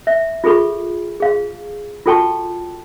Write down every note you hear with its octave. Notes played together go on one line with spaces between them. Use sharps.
E5
F4 G#4 A4 B5 C#6
G#4 F5
F4 F#4 A4 G5 A5 C#6